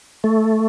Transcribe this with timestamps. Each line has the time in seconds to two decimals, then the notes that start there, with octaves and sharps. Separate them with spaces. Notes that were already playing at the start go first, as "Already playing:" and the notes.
0.24 A3